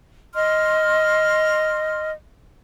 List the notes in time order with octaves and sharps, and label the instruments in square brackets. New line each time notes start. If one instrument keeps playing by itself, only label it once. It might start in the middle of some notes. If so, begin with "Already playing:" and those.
[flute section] D#5 C6 F6